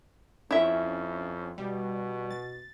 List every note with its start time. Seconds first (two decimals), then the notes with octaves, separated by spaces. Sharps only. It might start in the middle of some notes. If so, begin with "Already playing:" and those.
0.51 F2 C#4 E4 E5
1.58 B2 G3
2.30 A6